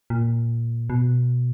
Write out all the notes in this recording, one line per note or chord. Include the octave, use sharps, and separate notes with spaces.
A#2
B2